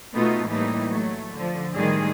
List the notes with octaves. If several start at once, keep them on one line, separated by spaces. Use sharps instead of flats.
B2 A3 B3 D#4 F4
A2 E3 G3 A#3 D#4
F#3 A3
D3 F3
A2 D#3 E3 G3 G#3 G#4